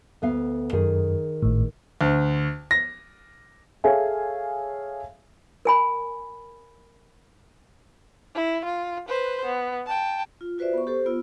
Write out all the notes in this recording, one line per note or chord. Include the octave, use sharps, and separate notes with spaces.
D2 B3 F5
F#2 D#3 G#4
G#1 A2
D2
A#6
G#4 A4 C#5 E5 F5 G#5
A#4 G#5 B5
E4
F4
B4 C5
B3
G5 A5
F4
F4 F#4 B4 C5 D5 E5
B3 C#6
G4 A4 C5
B3 F4 E6